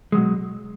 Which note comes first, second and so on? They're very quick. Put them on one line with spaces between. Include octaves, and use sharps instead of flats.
G#3 F#3 B2